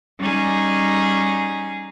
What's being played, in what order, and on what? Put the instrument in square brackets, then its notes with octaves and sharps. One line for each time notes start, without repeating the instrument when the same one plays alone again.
[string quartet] G3 C#4 D#4 G#4